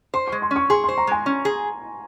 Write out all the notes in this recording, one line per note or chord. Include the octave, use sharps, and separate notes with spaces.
C5 C6
G#3 C#6
C6
C#4
C#6
G#4 C6
C5 C6
A#5
G#3 G#5
C#4
G#4